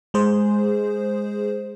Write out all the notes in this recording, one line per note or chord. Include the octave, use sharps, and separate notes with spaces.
G#3 G#4 C5